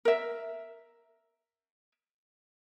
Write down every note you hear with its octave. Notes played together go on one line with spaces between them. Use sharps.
A#4 E5